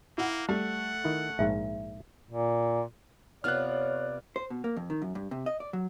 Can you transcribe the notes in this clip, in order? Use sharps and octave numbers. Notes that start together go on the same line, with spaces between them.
A#3 E4 F#5
G3 A3 F#5
D#3 E4
A#1 G#2 E5 F5
A#2
C3 B3 F4 C#5 D5 F6 F#6
C5
B2
A#3
F2
D#3
F#2
G2
C3
D#5
D5
F#3